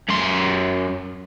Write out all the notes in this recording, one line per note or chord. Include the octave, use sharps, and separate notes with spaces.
F#2 C6